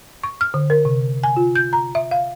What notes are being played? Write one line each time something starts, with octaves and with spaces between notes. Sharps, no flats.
C#6
F6
D3
A#4
C3
G#5
F4
G6
A#5
E5
F5